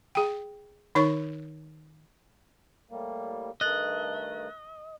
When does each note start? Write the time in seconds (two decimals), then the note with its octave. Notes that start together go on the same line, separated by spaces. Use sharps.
0.15 G#4 G5
0.95 D#3 D#4 C#5 C#6
2.91 A2 G3 A#3
3.61 G2 D#3 A3 D#5 F#6 A6 F#7